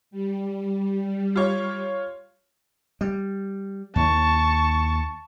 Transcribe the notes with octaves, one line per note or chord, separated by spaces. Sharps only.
G3
F4 C#5
G3
D#2 A5 C#6